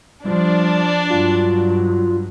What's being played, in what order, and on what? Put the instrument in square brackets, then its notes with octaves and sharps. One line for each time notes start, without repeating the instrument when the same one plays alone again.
[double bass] F3 [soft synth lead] G3 [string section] D4
[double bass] G2 F#3 [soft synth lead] F4